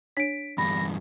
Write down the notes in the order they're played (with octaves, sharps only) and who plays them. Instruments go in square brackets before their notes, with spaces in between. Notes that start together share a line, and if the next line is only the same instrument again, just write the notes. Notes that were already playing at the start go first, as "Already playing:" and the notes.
[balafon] D4 C#5 [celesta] B6 D7
[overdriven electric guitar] E2 G2 [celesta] B5 [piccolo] A#6